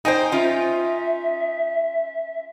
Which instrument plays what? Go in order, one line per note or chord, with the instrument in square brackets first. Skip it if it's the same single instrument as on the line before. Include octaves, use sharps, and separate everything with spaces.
[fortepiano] D#4 [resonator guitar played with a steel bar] C5 G5 G#5
[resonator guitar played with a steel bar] C#4 F4 G5 [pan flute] E5